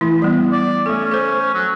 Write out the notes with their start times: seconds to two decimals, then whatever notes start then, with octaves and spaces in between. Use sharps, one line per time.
0.01 E3 A3 E4
0.22 G3 B3
0.52 D5
0.86 A3 C#4 A4
1.11 A4 C5
1.54 F#3